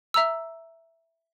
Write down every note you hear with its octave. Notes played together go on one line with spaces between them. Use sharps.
E5 A#5 E6